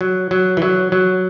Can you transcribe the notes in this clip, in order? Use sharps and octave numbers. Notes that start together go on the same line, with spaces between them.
F#3
F#3
E3
F#3
F#3